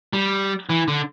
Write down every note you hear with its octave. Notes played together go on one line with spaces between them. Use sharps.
G3
E3
D3